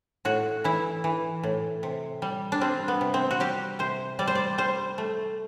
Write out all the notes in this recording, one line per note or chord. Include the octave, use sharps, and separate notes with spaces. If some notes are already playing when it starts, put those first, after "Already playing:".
A2 F#4
E3 E4
E3
A2
C3
G3
D4
G3 C4
B3
C3
C4
F#4
G3 G4
C3 C5
G3 D5
C5
D5
G3 C5
A3